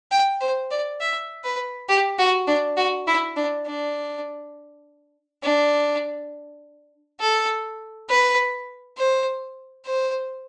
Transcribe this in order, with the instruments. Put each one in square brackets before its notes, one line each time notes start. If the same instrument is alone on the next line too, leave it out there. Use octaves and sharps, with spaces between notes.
[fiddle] G5
C5
D5
E5
B4
G4
F#4
D4
F#4
E4
D4
D4
D4
A4
B4
C5
C5